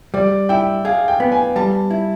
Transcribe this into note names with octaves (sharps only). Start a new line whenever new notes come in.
G3 D5
E4 G5
G#4 F5
G5
B3
G#5
G3 A5
E4